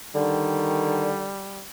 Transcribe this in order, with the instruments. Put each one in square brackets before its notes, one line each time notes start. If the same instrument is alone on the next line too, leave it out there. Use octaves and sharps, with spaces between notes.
[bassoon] D3 [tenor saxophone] D#3 [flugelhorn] G3